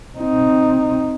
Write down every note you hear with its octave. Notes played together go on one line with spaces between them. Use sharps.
C4 D#4